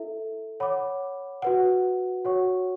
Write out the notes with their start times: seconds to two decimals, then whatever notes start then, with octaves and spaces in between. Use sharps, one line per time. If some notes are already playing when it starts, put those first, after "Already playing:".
Already playing: E4 A4 E5
0.60 C#5 F#5 B5 D6
1.42 F#4 B4 F#5
2.25 F#4 C#5 F#5 C#6